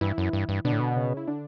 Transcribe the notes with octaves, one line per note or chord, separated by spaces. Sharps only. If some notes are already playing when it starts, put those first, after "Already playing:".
G2 E3 E4
F#2
G2
G2
B2 D3 D4
A2
B2
C#3 C#4
E4
D3 D4